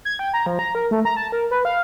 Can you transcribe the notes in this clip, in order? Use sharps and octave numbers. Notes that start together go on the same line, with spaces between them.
G#6
G5
A#5
F3
A#5
A#4
A3
A#5
A5
A#4
B4
F5